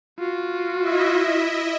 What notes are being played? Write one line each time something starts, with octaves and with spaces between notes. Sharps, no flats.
F4 F#4
E4 D#5 E5